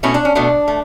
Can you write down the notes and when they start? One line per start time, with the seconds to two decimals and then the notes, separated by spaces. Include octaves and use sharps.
0.03 B2 A3 C#4 E4
0.14 D4
0.25 C#4
0.35 B2 A3 D4
0.68 A3